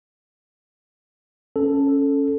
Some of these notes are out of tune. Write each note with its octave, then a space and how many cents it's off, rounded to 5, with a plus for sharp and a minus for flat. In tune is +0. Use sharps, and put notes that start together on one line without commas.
C#4 +0 A4 +0